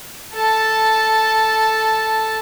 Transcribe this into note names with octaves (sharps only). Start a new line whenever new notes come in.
A4 A5